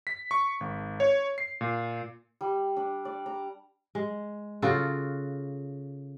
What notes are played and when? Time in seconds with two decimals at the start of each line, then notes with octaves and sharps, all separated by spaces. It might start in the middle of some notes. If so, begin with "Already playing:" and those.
0.07 B6
0.31 C#6
0.60 G#1
1.00 C#5
1.38 C7
1.61 A#2
2.41 G3
2.76 D4
3.05 D5
3.26 A#5
3.95 G#3
4.62 C#3 F4 F#4 A4